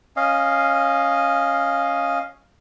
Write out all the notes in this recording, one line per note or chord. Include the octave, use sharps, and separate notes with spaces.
C#4 D#5 F5